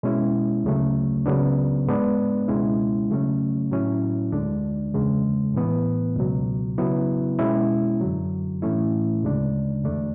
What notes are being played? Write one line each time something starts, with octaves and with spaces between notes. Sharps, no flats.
B2 G#3 C#4 E4
D2 C#3 F#3 A3
C#2 C#3 F#3 B3 D4
G#2 G#3 B3 D4
C#2 B2 G#3 C#4 E4
C#3 F#3 A3 C#4
A2 F#3 C#4 E4
D2 D3 G#3 D4
E2 C#3 G#3
A2 E3 B3
C#2 B2 F#3
C#3 F#3 B3 E4
B2 G#3 C#4 E4
F#2 D3 F#3
A2 E3 A3 C#4 E4
D2 C#3 G#3 D4
E2 D3 A3 D4